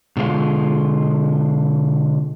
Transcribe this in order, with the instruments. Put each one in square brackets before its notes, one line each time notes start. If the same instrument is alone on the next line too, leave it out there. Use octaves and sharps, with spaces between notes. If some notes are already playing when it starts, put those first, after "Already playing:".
[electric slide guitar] B2 D3 G#3 F4